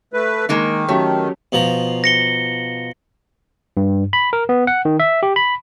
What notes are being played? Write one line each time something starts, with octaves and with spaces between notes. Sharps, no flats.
A3 B4
D#3 G#3 A#3 D#4
F#3 A3 C#4 G4
B2 F3 A#5
A#6 C#7 G7
G2
B5
A#4
B3
F#5
D#3
E5
G4
B5